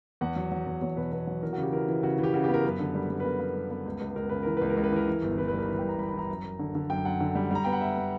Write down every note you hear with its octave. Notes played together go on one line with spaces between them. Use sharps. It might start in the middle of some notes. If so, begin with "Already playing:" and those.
E2 F#5
F#3
F#3
E2
E2 C#5
B2 B4
B2 B4
F#3
E3 A#4
C#3 F#4
G4
E3 A#4
E3
C#3 F#4
E3
G4
C#3 F#4
B3 G4
A#4
F#2 B4
D3
G3
G3
B4
B3 A#4
B3
G3
B3
C#2
C#2
C#2 A#4
C#3 B4
E3 A#4
C#2 B4
A#4
C#2
B4
E3 A#4
E3
G1
E3 B4
B4
G3 A#4
E3
G1 G5
A#5
G3 B5
E3 B5
A#5
F#2
F#2
D3
D3
F#2 G5
F#2 F#5
D3
G3
G3 A#5
B3 G5
F#5
B3 E5
B3